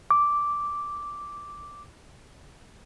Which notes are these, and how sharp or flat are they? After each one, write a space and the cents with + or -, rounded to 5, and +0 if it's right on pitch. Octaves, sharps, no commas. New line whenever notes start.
D6 -5